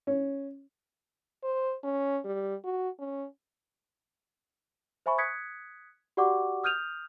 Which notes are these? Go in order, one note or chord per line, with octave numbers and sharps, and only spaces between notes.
C#4
C5
C#4
G3
F#4
C#4
C5 E5 G#5 B5 C#6
D#6 F#6 G#6 B6 C#7
F#4 G4 D5 F#5 C#6 D6
D#6 F6 G6 D#7 F7